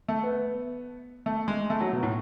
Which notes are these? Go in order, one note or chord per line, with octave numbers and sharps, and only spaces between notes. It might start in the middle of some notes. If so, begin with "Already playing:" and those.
A3
B3
A3
G#3
A3
F#3
B2
A2